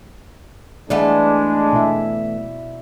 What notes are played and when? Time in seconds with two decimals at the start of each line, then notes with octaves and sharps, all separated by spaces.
0.90 E3 G#3 A3 B3 D4 D5
1.73 B2 E4 E5